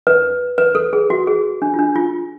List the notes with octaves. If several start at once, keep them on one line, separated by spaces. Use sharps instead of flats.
B4
B4
A4
G#4
F#4
G#4
D4
F4
D4
F4